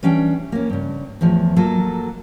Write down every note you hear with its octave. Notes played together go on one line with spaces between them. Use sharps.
E3 G3 C#4 D4 G5
A#3 C#4
G2 C#3
E2 A2 F3
F#3 A#3 F4 A4